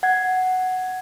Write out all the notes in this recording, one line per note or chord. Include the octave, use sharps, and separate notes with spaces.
F#5 G#6